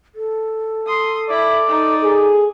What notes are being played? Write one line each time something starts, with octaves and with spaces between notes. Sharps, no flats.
A4
C6 D#6
E4 D5
D#4
G#4 A4